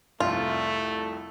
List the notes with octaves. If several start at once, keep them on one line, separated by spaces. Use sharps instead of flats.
C2 F2 A3 F4